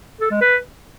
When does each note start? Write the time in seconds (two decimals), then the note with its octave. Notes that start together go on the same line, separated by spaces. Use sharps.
0.20 A4
0.31 G#3
0.41 B4